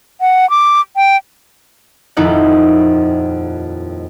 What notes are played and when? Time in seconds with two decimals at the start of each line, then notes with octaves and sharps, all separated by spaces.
0.21 F#5
0.50 D6
0.96 G5
2.17 D#1 F2 D#4 E4 F#5